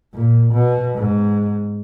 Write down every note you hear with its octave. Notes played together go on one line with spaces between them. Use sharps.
A#2
B2
G#2